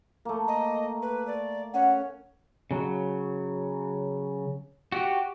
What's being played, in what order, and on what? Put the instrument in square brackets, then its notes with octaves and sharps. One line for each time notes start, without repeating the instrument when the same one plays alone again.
[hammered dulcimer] A3 A#3
[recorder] D#5
B4
D5
[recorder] C#4 [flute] F#5
[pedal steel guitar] C#3 F#3
F#4 G4